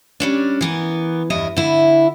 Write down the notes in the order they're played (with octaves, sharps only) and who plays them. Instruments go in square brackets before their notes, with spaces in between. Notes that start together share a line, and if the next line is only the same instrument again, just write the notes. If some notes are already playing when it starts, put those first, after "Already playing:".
[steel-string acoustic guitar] G3 C#4 D4
E3 B3 A#4
E2 G2 E4 D#5
D3 E4